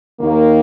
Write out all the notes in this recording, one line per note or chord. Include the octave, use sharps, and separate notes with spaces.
D#2 D#3 A#3